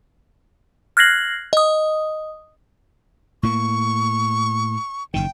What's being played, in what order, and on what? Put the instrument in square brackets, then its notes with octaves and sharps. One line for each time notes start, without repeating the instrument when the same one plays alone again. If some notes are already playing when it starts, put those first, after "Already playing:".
[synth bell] F6 F#6 G#6 A#6 C7 F#7
D#5 D#6
[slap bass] A2 A#3 [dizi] C#6
[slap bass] F#1 C2 D#3 [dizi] G5